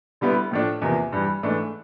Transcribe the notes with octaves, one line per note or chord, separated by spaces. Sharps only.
D3 G3 B3 E4
A2 F3 A3 D4
E2 C3 F3 A#3
G2 E3 G3
G#2 E3 A3 D4